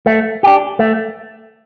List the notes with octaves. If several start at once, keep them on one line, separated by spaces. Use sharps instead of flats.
A3
D4 G4
A3